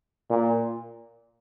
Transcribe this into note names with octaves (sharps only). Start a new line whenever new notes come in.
A#2